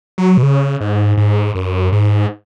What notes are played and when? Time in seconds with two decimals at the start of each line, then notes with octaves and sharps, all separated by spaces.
0.18 F#3
0.37 B2
0.43 C#3
0.81 G#2
1.17 G#2
1.55 F#2
1.92 G#2